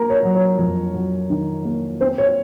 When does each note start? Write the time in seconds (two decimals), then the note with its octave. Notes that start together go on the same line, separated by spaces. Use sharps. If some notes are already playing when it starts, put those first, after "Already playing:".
Already playing: A#3 A#4 A#5
0.10 C#5
0.23 F#3
0.35 C#5
0.58 F2
0.94 F#3
1.30 D#3
1.65 A#3
2.01 C4 C5
2.18 C#5